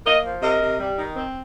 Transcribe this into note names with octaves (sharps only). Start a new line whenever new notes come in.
A#3 A#4 D#5
F3
C3 A#4 D#5
C3
G3
D#3
C4